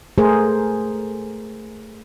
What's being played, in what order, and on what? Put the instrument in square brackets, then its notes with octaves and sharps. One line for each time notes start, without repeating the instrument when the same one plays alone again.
[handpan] A3 G#4 A#4 C5